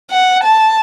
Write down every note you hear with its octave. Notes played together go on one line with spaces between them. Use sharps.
F#5
A5